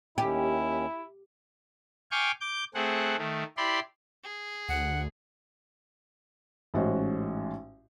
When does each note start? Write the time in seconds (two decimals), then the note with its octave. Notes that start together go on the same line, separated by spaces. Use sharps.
0.18 D#2 D#3 C#4 E4 G4
2.11 F5 G5 G#5 C#6 D6
2.41 D6 G6
2.75 A3 C4 G#4 F#5
3.18 D#3 A3
3.57 E4 G4 D5 B5 C6
4.24 G#4
4.69 D2 F#5
6.74 A1 G#2 C#4 F#4 C5 D#5